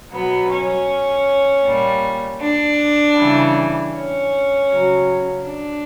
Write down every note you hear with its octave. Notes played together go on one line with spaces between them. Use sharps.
B2 F#3 B3
C#4
A#2 G3
D4
C#3 E3 G3
C#4
C#3 F#3
D4